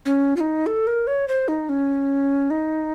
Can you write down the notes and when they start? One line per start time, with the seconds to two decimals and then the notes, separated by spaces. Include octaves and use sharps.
0.05 C#4
0.36 F4
0.40 D#4
0.66 A4
0.87 A#4
1.07 C#5
1.28 C5
1.48 D#4
1.69 C#4
2.50 D#4